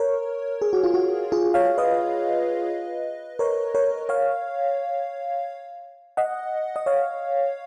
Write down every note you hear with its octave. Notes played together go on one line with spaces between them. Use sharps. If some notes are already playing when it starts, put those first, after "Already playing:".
Already playing: A#4 C#5
G#4
F#4
F4
F#4
F4 G#4
C#5 F5
B4 D#5
A#4 C#5
A#4 C#5
C#5 F5
D#5 F#5
D#5
C#5 F5